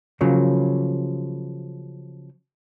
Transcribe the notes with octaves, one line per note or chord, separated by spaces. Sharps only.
C#3 F3 F#3 A#3